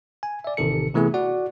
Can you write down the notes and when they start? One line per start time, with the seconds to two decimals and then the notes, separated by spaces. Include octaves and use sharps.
0.23 G#5
0.44 D5 E5
0.57 A1 C3 D#3 A4 C#7
0.95 C3 E3 A3 B3 E4 G#4
1.14 F#4 D5 F#5